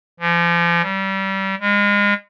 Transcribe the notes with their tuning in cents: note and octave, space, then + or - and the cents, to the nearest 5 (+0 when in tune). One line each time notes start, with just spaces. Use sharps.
F3 -35
G3 -25
G#3 -30